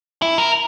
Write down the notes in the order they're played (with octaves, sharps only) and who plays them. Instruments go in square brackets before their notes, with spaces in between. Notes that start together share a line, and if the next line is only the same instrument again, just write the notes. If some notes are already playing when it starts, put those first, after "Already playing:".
[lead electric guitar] E4
A#4